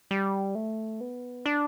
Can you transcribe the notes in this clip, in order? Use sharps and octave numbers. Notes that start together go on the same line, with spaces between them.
G3
A3
B3
D4